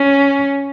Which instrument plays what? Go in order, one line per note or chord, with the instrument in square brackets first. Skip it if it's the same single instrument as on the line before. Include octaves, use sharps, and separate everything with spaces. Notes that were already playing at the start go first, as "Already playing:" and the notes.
Already playing: [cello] C#4